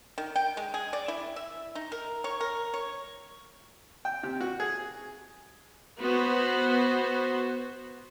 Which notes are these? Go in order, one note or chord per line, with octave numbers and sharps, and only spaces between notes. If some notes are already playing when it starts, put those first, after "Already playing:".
D#3
G5
G#3
G#4
D5
E4
E5
D#4
A#4
C#5
A#4
C#5
G5
C3
F#4
G#4
B3 F#4 C5